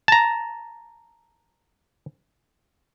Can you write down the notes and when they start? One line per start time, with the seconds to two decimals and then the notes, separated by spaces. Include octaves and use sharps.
0.08 A5 A#5